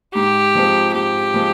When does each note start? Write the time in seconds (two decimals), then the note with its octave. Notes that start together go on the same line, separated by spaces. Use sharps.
0.15 G#2 G4
0.55 F3 G#3 C4
0.94 G#2 G4
1.34 F3 G#3 C4